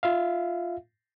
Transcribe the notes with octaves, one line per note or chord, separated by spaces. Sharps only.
F4 E5 F5